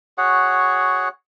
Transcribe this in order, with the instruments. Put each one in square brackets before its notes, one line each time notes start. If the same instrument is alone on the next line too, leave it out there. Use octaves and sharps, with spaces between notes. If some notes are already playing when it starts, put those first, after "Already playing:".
[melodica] F#4 G#4 C#5 F#5